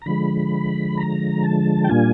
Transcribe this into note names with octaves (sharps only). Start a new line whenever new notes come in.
A#5
D3 F3 G#3 B5
A#5
A5
G5
A#2 G3 A#3 D4 F4 G#5